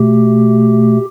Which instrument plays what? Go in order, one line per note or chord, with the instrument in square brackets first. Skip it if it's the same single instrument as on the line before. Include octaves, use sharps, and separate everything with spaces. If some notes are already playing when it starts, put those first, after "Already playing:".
Already playing: [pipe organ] B2 A3 G4